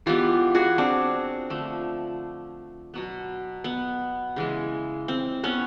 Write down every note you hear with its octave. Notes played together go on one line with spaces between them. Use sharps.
E3 G#3 B3 F4 G4
F#4 G#4
C4 D4
D3 F3 A3
B2 F#3 B3
B3
C#3 E3 G#3
C4
B3 C#4